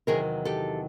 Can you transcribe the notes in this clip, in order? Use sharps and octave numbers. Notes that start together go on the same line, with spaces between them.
E2 C3 D#3 F#3 G#4 A#4
G4 A4